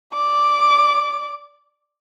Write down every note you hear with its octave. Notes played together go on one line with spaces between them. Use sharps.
D5 D6